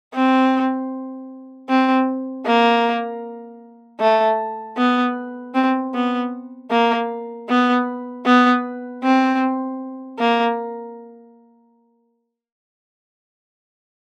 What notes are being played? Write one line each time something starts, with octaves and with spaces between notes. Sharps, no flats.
C4
C4
A#3
A3
B3
C4
B3
A#3
B3
B3
C4
A#3